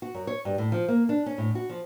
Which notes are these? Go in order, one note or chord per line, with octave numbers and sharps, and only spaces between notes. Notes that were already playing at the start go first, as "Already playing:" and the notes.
F#4
F#2
C#5
G2
A2
F3
A#3
D4
C#4
A2
F#4
F3